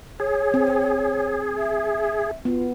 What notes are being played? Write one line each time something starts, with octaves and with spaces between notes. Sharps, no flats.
G#4 C#5
C4
E5
B3 F4